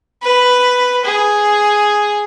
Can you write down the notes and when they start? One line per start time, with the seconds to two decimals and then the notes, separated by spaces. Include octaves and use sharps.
0.23 B4
1.05 G#4